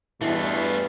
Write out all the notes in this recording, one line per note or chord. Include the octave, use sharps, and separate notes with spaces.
E2 G2 B2 E3 A3 F4